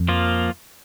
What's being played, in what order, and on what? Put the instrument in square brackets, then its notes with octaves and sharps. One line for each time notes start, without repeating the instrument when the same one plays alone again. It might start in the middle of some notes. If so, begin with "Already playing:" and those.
Already playing: [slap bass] F2
[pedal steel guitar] F3 A#3 F4